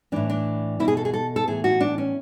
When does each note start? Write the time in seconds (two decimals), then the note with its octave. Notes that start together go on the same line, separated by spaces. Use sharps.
0.12 A2 E3 D4
0.30 D4
0.80 B2 E4
0.88 G#4
0.97 A4
1.05 G#4
1.14 A4
1.36 A4
1.48 A2 E3 G#4
1.64 F#4
1.80 D4
1.98 C#4